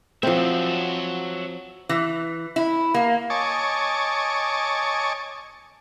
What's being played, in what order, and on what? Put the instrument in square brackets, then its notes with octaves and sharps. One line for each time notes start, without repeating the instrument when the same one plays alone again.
[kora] F3 C4 [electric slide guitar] F#4 C#5 E5
[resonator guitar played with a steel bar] E3
E4
A#3
[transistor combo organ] C#5 D#5 G#5 A5 C#6 D6